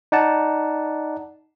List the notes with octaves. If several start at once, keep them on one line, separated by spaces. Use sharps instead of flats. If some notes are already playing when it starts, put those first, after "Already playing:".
D#4 D5 F#5 A5